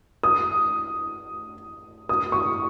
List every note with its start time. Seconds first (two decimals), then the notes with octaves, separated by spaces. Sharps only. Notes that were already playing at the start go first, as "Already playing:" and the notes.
0.23 D#6
2.09 D#6
2.32 C#6